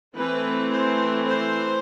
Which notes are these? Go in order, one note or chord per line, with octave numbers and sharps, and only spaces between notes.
E3 A3 C4 B4
C5
C5